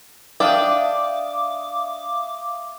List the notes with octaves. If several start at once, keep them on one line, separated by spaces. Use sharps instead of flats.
D4 E5 F5 G5 D6 D#6